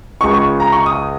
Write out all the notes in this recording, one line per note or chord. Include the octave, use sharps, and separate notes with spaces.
C#2 C#3 G#3 C#6
C#6
A#5
C#6
D#6